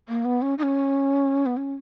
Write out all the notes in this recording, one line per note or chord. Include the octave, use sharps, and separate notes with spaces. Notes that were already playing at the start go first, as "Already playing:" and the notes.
A#3
B3
C#4
D#4
C#4
B3
C#4